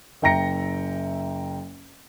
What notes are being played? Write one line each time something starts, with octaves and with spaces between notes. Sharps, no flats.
F#1 E5 G5 A#5 A#6 C#7